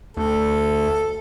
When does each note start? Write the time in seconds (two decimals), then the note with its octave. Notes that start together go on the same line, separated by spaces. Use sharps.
0.17 D2 A4